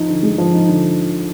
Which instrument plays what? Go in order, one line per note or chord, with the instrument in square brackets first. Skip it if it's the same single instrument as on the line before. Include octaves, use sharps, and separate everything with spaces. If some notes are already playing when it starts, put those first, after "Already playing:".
Already playing: [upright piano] F3 D#4
D3
G#3
F3
D#4
D3